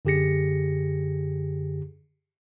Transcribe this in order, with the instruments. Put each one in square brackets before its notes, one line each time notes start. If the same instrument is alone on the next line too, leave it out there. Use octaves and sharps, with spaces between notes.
[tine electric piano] F#2 D3 G4 G#4 A#6 C#7